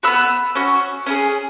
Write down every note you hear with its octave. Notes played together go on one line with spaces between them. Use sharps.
B3 F#4 B5 E6
C#4 F#4
C#4 E4 G#4